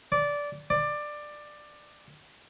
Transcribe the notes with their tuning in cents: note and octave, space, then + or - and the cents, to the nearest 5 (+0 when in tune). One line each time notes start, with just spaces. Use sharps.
D5 -15
D5 +15